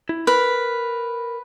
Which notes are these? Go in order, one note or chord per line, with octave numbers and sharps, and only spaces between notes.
E4
A#4 B4 B5